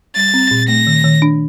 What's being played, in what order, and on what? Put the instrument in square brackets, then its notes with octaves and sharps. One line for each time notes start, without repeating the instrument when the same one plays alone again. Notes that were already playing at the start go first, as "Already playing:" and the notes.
[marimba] G3 [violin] A6
[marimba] C4
A#2
[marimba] A3 [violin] A#6
[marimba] D#3
D#3
D4